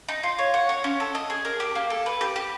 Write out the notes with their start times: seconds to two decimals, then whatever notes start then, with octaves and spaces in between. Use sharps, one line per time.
0.08 D#4
0.23 F4
0.39 C#5
0.54 F#5
0.69 C#5
0.84 C#4
1.00 A4
1.15 D#5
1.30 G#4
1.45 A#4
1.60 G4
1.75 A#3
1.90 A4
2.06 B4
2.21 G4
2.36 G4